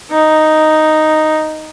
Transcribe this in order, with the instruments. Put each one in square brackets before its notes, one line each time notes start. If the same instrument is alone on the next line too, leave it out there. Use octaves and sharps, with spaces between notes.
[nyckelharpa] D#4